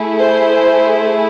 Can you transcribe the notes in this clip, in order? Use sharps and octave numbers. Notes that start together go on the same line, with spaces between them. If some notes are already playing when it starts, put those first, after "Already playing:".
Already playing: A3 E4 G#4
C5